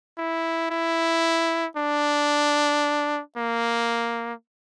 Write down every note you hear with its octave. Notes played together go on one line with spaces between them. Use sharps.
E4
E4
D4
A#3